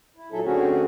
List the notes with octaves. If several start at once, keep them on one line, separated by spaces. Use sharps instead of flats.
E4
A#2 F#3 D#4 G#4 A4 E5
D3 A3 C4 C#4 F#4 G#4